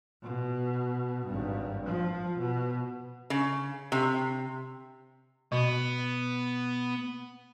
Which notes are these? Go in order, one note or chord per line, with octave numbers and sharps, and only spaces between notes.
B2
G#1 G2
F3
B2
C#3
C3
B2 B3